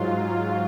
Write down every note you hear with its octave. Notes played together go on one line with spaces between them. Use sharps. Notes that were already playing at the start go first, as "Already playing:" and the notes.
Already playing: G#2 F#3 F4